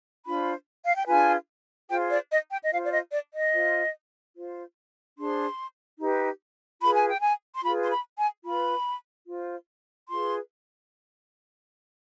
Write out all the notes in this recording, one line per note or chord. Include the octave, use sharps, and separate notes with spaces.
D4 F4 C5 B5
F5
G5
D4 F4 G#4 B4 G#5
F4 G#4 C5 G5
D5
D#5
G5
D#5
F4 C5 F5
D5
D#5
D5
D#5
F4 C5
F4 C5
D4 G#4 C5 C6
D#4 G4 B4
F4 G#4 B4 B5
G#5
G5
G#5
C6
F4 G#4 B4 B5
C6
B5
G#5
F4 B4 B5
F4 C5
F4 G#4 B4 C6